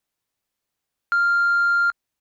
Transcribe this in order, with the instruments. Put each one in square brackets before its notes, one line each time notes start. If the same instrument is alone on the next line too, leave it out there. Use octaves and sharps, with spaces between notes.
[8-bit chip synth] F6